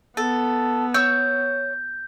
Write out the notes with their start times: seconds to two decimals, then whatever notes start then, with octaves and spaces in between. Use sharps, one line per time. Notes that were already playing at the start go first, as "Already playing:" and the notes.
0.17 B3 A4
0.94 C#5 E6 G6